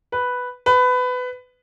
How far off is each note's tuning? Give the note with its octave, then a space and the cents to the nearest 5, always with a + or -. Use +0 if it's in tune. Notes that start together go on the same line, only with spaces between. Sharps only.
B4 +0
B4 +20